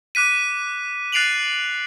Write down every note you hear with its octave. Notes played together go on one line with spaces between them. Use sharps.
D6 F#6 B6 D#7
F#6 A6 C7 D7 F7 F#7